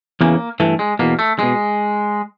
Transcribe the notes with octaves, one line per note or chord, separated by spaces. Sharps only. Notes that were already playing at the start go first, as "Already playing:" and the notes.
E2 C#3 E3 A#3
G2 E3 A3
G#3
E2 B2 A#3
A3
B2 G#3